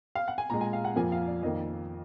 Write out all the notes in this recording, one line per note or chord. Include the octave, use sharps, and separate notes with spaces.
F5
F#5
G#5
A#2 G#3 A#5
G#5
F5
F#5
F2 F3 A#3 G#5
F5
D5
F2 D#3 A#3 D#5